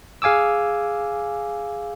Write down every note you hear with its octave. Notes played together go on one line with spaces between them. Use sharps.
G#4 F5 G#5 D6 E6